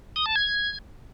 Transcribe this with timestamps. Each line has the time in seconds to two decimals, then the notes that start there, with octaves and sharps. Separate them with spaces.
0.16 D#6
0.26 A5
0.36 G#6